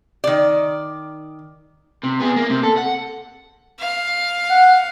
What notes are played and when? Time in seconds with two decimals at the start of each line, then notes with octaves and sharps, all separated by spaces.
0.24 D#3 D5
2.03 C3
2.20 B3 G#4
2.36 A#3
2.50 C3
2.63 A4
2.77 F#5
3.80 F5
4.50 F#5